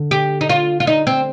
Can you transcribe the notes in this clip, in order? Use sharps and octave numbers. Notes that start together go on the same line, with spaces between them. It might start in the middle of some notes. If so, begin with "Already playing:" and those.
Already playing: D3
G4
D#4
F4
F4
D#4
C4